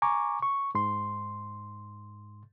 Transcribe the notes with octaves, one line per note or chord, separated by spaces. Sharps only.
G#5 A#5 C#6 D6
C#6
G#2 C6